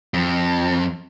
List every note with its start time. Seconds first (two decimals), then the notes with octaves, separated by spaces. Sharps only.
0.14 F2